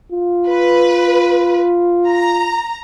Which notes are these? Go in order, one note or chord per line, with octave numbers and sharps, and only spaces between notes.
F4
B4
A#5